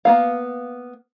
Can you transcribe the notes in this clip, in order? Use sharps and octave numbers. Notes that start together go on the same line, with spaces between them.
A#3 B3 F5